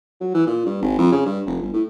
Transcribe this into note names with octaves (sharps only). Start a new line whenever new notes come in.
F#3
E3
A#2
G2
G#1
F2
C#3
G2
F1
G1
A2